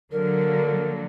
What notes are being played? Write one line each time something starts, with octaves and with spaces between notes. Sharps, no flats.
D3 F#3 A#3 A#4